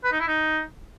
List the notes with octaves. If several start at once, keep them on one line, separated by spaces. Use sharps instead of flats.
B4
D#4
E4
D#4